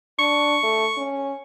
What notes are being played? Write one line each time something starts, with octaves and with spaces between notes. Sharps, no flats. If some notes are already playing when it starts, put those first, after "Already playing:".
D4 C#6
A3
C#4